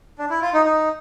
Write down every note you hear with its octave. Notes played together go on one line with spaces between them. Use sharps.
D4
E4
F4
D#4
D#4